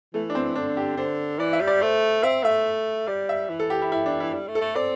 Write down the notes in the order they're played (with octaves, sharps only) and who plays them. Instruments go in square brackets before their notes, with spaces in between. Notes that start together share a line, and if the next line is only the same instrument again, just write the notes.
[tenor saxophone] E3 [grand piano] A3
[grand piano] D4
C4
[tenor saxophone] D3 [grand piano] D4
[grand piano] G4
[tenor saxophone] D3 [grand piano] C5
[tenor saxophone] E3 [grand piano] D5
[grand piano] E5
[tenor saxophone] G3
[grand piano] D5
[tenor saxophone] A3 [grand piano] C5
[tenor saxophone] C4 [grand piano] E5
[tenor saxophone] A3 [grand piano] E5
[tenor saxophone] G3 [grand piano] D5
[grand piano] E5
[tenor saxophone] E3
[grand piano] A4
G4
E4
E4
D4
E4
[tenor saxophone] G3
A3
[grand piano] A4
[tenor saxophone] A3
[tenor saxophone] C4 [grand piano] D5